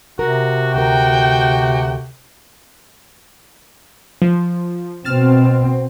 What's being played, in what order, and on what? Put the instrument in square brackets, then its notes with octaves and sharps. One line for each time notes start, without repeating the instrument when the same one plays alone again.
[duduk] C3 [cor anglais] F#4 [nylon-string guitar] A#4
[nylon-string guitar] D2 A#4 [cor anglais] F#4 [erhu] G5
[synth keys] F3
[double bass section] B2 C4 [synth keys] F6 A6 E7